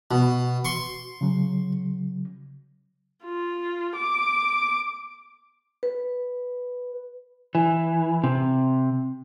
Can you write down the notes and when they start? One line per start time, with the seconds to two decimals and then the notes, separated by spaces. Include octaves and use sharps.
0.11 B2 F#4
0.65 C6 C#6
1.21 C#3 F#3
3.24 F4
3.96 D6
5.83 B4
7.55 E3
8.24 C3